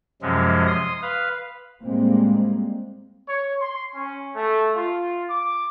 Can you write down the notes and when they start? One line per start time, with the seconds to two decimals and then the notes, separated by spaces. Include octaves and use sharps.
0.22 F#2 C3 F3 F#3 G#3 C#4
0.67 C6 D#6
1.02 B4 F5
1.83 A2 G3 G#3 A#3 C4
3.27 C#5
3.61 C6
3.95 C#4
4.35 A3
4.74 F4
5.30 D6